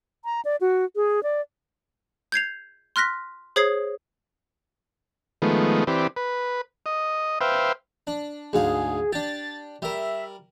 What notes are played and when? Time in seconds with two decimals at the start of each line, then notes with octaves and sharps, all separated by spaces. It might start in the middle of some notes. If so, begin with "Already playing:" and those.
0.25 A#5
0.45 D5
0.61 F#4
0.96 G#4
1.23 D5
2.32 G6 G#6 C7 F7
2.96 C6 F6 F#6 A#6 B6
3.56 G#4 C5 C#5 D#6 G#6 C7
5.42 D#3 F3 G#3 A3 B3
5.87 E3 C4 G4 B4 D5
6.17 B4
6.86 D#5
7.41 B4 C5 E5 F5 G5
8.07 D4
8.53 D2 G#2 G#4 F5
9.13 D4 G4 A6
9.82 G3 A#4 E5